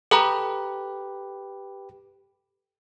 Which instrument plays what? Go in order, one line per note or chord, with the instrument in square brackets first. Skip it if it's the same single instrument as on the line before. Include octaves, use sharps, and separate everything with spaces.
[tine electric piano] G4 B4 [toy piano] A4 A5 A#5